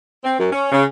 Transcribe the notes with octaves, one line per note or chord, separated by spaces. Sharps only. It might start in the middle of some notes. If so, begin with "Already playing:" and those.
C4
F#2
C#4
C#3